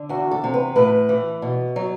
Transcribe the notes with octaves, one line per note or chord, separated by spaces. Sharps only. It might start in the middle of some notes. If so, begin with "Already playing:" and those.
Already playing: D3
E2 F#4
A4
C3
B4
A2 B4
E3
B2
F#3